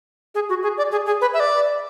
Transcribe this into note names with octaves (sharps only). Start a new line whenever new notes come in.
G#4
F#4
G#4
D5
G#4
G#4
B4
E5
D5